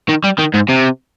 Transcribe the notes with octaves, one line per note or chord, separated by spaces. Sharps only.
D#3
G3
D#3
G#2
C3